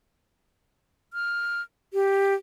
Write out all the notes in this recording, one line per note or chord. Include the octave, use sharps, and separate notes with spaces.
F6
G4